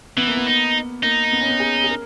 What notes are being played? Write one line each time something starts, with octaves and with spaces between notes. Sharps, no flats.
E3 B3
A#3
B3
D#4
A#3 D#4
B3
C#4
B3
G#4
G#4
A#4